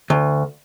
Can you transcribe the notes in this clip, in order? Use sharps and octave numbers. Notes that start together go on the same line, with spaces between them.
D2